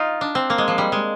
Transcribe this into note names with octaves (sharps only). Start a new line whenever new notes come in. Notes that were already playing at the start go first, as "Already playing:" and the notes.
Already playing: D#4 F4
D4
C4
A#3
G#3
F3
G3
G#3